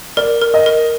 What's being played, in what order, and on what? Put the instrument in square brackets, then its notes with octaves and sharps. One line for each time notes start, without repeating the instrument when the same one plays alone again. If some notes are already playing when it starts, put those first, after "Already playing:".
[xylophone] A#4 [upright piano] D5
[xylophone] A#4
[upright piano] D#5
[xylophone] A#4